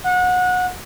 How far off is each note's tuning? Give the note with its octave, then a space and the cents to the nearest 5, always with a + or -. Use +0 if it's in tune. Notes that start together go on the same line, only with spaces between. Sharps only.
F#5 -25